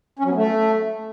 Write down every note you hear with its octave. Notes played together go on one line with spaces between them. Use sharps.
C#4
F#3
B3
A3